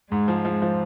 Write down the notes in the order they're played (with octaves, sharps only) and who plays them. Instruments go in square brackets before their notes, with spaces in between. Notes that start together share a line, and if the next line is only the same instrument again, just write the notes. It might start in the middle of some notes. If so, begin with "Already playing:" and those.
[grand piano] G#2 [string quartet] G#3
[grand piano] F3
F3
F3